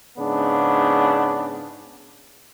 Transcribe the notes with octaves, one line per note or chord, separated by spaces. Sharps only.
G#2 C#3 B3 D4